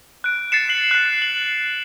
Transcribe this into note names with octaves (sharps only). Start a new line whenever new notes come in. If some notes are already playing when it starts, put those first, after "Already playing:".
F#6 D7
A6 C7 C#7 E7
C7 F#7
F#6 C7
F#7